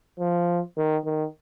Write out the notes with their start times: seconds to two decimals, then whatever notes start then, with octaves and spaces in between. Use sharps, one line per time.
0.20 F3
0.77 D#3
1.05 D#3